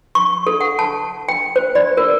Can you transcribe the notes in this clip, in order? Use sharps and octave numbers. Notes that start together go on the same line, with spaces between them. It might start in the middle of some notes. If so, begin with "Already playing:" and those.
C#6
A4
F#5
A5
G5
C5
D5
A#4